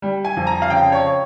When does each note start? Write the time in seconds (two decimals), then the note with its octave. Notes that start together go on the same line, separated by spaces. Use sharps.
0.02 G3
0.25 G#5
0.37 F2
0.47 A#5
0.62 F5
0.70 C#3 G5
0.92 C#5